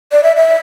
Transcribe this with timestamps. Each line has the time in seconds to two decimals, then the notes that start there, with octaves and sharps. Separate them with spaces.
0.12 D5
0.23 E5
0.36 E5